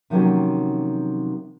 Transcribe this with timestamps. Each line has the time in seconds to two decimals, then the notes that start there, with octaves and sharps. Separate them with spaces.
0.10 C3 D#3 F3 F#3 A#3 C#4